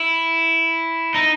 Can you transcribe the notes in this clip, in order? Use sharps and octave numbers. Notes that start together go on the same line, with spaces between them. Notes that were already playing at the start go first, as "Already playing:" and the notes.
Already playing: E4
D#4